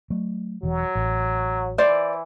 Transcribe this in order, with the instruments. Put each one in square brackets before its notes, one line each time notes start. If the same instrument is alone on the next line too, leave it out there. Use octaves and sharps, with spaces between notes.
[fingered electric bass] F#3 A3
[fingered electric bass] E1 E3 [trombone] F#3
[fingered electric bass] A1
[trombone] E3 [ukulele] C5 D5